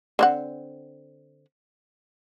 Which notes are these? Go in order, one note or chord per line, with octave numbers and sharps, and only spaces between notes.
D3 C4 F#5